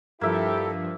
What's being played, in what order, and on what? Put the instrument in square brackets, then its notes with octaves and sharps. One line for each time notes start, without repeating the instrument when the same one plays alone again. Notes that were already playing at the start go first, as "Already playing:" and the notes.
[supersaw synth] G2 F3 [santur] A#3 E5 [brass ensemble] E4 G4 [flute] A4